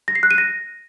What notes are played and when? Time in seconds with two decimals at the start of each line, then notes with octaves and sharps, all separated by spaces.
0.08 A#6
0.15 C7
0.23 F#6
0.31 D#7
0.38 A#6